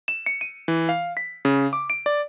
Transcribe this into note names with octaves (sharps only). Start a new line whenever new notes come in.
E7
C#7
D#7
E3
F5
B6
C#3
D6
D7
D5